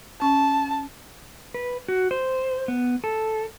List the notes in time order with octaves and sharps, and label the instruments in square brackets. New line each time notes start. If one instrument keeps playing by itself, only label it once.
[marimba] C#4 [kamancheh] A5
[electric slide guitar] B4
F#4
C5
B3
A4